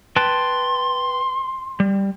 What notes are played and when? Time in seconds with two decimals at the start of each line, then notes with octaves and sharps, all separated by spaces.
0.16 B4 G5 A5 C6
1.80 G3